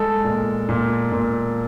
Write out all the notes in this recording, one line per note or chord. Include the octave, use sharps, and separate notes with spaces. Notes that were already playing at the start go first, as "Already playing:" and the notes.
Already playing: G#3 A4
A#2
A#2
A#2